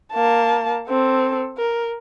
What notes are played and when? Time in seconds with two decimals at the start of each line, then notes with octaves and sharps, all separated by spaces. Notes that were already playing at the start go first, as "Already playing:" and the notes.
0.13 A#3 A5
0.88 C4 A4
1.57 A#4